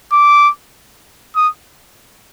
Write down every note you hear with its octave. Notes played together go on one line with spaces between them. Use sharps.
D6
D#6